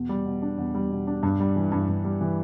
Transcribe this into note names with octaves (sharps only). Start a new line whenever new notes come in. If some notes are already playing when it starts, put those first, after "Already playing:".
Already playing: E2 B2
G3
B2
D4
E2
G3
B2
D4
G2
G3
E3
G2
G2
G3
E3